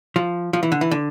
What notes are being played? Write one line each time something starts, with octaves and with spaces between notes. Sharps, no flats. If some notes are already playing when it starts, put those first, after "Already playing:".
F3
F3
E3
D3
E3
D3